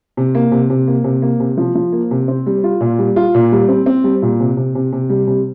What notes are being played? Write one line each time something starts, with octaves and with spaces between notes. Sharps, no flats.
C3
A#3
C3
C3
A#3
C3
A#3
C3
F3
F3
A#3
C3
C4
G3
F4
A#2
G3
F4
A#2
G3
C4
C4
G3
A#2
C3
C3
C3
C3
G3
C3